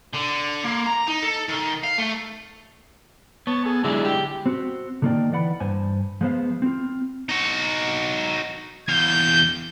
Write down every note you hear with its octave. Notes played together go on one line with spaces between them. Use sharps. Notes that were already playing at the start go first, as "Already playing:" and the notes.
D3
A#3
A#5
D#4
A4
D#3
F5
A3
B3 C#5 A5
G#4 A4
D3 F#3 G#3 E4 G#4
G4
C4 F#4
D3 D#3 A#3 D#4 D5 G5
E3 D5 F#5 B5
G2 C5 G#5
F3 G#3 B3 C5 F5
C4 F4
D#4 F#4
E2 F5 G6